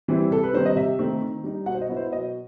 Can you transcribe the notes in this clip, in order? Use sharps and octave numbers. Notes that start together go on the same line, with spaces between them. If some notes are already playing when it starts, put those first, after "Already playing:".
E3 G3 C4 E4
C3 A4
B4
D#3 G3 C4 D#4 C5
D#5
C3 E5
D#3 A3 C4 D#4
D#3
G3 D#4
B2 F#5
C5
D#5
F#3 B3 E4
C5
B2 D#5